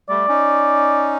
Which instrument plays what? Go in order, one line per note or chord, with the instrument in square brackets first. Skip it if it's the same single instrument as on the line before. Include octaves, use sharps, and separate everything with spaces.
[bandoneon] G3 A3 [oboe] D5
[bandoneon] C#4 D#4